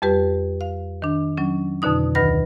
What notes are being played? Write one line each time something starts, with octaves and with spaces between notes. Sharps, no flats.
F2 G3 G4 B4
F5
D#3 D4
F#3 C#4
F2 B2 D3 D#4 D#6
D2 D#3 B4 B5 A#6